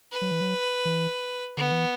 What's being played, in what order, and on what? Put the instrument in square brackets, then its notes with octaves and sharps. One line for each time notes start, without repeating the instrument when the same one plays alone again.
[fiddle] B4
[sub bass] F#3
E3
F#3
E3
[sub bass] D3 [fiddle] B3
[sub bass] E3